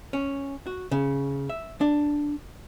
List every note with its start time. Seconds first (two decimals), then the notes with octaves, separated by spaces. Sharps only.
0.13 C#4
0.67 F#4
0.91 C#3
1.49 E5
1.81 D4